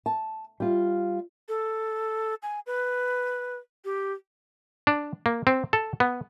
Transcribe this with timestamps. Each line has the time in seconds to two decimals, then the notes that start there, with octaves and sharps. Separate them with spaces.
0.06 A5
0.60 G3 F4
1.49 A4
2.43 G#5
2.67 B4
3.85 G4
4.87 D4
5.26 A#3
5.47 C4
5.73 A4
6.00 B3